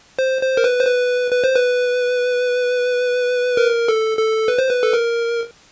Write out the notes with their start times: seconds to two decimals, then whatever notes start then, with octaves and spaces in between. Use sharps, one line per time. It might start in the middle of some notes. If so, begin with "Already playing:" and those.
0.19 C5
0.42 C5
0.57 A#4
0.64 B4
0.80 C5
0.87 B4
1.31 B4
1.44 C5
1.56 B4
3.57 A#4
3.88 A4
4.18 A4
4.48 B4
4.58 C5
4.69 B4
4.83 A4
4.93 A#4